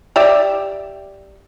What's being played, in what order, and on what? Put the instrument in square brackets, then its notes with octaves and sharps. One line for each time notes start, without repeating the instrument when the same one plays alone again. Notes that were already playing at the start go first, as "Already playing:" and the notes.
[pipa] G4 D5 E5